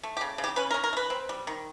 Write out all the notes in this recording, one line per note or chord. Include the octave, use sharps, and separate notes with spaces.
A3
G4
C#3
C#3
G4
C#4 B4
A#4
C#4
A#4
A3
B4
C4
G3
D#3